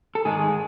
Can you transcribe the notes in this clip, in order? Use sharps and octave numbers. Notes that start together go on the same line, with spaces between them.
A4
G#2 D#3 G#3 G#4